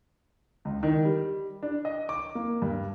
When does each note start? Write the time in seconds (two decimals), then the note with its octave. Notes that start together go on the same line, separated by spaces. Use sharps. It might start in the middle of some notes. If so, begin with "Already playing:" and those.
0.65 C#2
0.83 D#3
1.05 G3
1.63 D4
1.85 D#5
2.09 D6
2.35 A#3
2.62 G2